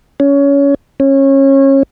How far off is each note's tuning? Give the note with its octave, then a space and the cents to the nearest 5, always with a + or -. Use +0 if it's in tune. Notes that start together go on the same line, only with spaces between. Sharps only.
C#4 +20
C#4 -25